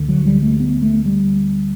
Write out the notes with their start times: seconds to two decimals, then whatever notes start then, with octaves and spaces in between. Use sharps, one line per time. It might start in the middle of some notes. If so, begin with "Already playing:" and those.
Already playing: D2 D3
0.09 F#3
0.25 G3
0.42 A3
0.60 B3
0.82 A3
1.05 G3